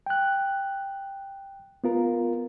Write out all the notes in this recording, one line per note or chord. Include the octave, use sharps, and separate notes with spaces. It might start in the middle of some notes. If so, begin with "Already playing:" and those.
G5 F#6
B3 F4 A#4